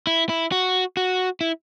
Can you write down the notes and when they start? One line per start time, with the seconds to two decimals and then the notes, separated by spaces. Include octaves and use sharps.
0.07 E4
0.29 E4
0.52 F#4
0.97 F#4
1.41 E4